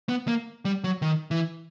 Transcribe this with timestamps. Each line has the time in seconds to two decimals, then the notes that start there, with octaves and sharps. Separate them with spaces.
0.09 B3
0.28 A#3
0.65 G3
0.84 F#3
1.02 D#3
1.31 E3